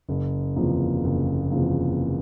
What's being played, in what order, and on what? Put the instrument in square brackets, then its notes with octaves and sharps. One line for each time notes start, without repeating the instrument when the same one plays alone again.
[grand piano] F#1
E2 C3 F3 A#3
F#1
E2 C3 F3 A#3